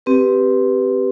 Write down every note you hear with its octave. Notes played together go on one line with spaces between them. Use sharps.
C4 G4 B4